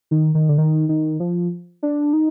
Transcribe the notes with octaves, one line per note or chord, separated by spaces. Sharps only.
D#3
D#3
D3
D#3
D#3
F3
D4
D#4